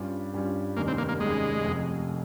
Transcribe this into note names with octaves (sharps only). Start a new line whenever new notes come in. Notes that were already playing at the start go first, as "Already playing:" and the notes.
Already playing: G2 G3 C#4 F4
G2 G3 C#4 F4
F1 D#2 D#3 G3 A#3 C#4
C4
A#3
A#3
F1 D#2 D#3 G3 G#3 C#4
F1 F2 C3